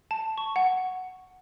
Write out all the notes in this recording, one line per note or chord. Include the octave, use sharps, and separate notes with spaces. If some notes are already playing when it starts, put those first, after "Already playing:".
A5
C#6
F#5